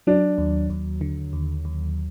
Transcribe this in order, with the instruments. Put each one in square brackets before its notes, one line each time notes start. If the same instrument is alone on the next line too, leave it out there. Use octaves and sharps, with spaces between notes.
[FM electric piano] F#3 [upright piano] D4
[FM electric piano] D#2
D#2
D3
D#2
D#2